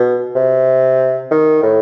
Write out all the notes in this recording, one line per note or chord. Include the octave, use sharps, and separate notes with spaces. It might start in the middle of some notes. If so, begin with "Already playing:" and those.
Already playing: B2
C3
D#3
A2